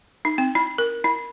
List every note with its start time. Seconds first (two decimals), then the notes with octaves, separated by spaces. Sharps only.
0.25 D#4
0.38 C4
0.55 E4
0.78 A#4
1.04 E4